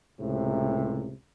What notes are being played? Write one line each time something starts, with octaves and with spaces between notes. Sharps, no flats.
C#2 A2 C3